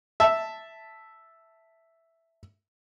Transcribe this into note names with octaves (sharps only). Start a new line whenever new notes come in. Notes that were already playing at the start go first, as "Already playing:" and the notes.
E5 A5